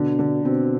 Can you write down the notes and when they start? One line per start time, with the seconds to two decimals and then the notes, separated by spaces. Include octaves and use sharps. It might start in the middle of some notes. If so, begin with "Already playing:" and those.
Already playing: B2 D3
0.19 D3
0.45 B2 C4